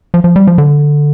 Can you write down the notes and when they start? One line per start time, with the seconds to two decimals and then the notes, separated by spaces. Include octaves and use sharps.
0.14 F3
0.24 F3
0.36 G3
0.47 F3
0.58 D3